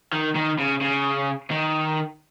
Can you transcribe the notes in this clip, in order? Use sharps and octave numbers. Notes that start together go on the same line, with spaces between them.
D#3
D#3
C#3
C#3
D#3